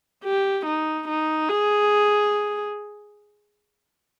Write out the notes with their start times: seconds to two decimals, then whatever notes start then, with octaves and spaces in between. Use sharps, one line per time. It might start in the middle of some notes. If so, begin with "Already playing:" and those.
0.24 G4
0.65 D#4
1.08 D#4
1.49 G#4